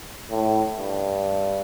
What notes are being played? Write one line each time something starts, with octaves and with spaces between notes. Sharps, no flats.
A2
G2